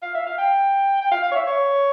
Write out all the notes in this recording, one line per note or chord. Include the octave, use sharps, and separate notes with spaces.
F5
E5
F5
G5
G5
F5
F5
C#5
E5
C#5